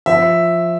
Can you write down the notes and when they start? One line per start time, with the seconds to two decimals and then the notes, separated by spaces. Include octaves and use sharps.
0.06 F3 E5